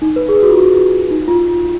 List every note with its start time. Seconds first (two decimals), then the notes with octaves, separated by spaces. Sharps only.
0.02 D#4
0.16 B4
0.29 G#4
0.43 F#4
0.50 F4
0.58 F#4
1.11 D#4
1.28 F4